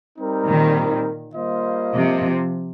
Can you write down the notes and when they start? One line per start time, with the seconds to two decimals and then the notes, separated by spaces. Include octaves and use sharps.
0.18 G3 C4 D#4 A#4
0.47 A#2 D#3
1.35 G3 A#3 F4 C5 D#5
1.94 C3 F3